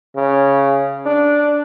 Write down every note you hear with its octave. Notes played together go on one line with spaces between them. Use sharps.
C#3
D4